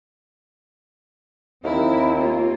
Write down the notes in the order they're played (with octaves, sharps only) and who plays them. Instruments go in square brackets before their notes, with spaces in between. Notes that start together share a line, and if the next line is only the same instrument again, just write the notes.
[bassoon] D#2 [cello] C4 E4
[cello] A#3 F4